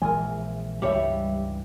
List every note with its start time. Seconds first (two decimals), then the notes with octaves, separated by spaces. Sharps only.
0.02 A#1 E3 G#3 A#4 G#5
0.82 C#2 G2 E3 G3 G4 C#5 E5